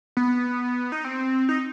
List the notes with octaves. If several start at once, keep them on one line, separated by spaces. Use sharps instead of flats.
B3
D#4
C4
D#4